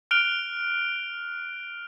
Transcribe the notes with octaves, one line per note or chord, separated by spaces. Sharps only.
F6 F#6 D7 F7 G7